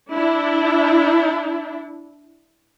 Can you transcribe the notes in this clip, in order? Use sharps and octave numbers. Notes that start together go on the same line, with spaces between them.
D4 E4